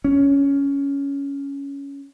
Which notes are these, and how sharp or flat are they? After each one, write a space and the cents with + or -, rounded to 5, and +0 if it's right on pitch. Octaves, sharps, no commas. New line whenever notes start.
C#4 +10